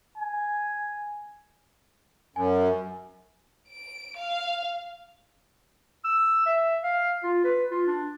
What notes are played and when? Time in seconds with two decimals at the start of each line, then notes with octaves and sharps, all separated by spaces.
0.17 G#5
2.36 F#2 G#5
3.69 D7
4.17 F5
6.04 E6
6.46 E5
6.84 F5
7.24 F4
7.44 B4
7.71 F4
7.87 D4